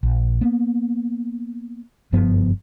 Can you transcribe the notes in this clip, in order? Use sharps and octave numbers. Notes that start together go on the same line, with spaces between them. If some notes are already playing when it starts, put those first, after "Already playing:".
A#1
A#3 B3
F#1 G2 F3 B3